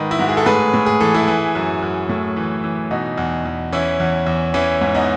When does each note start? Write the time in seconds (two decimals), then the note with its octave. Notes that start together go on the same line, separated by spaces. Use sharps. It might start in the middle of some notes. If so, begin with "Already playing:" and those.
Already playing: G#2 D#3 B4 D#5
0.11 E4
0.19 G#2 F#4
0.29 G#4
0.37 A4
0.46 A2 G#4 B4
0.74 A2
0.86 G#4
1.00 E3 A4
1.14 E4 G#4
1.28 E3
1.55 F#2
1.82 F#2
2.09 A2
2.36 E3
2.64 E3
2.91 B2 D#4 F#4
3.18 E2
3.46 E2
3.72 E3 C#4 E4
4.00 E2
4.27 E2
4.54 E3 C#4 E4
4.81 G#2
4.95 B3 D#4